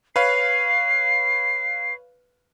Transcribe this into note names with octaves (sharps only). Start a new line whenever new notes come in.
B4 C#5 F5 C7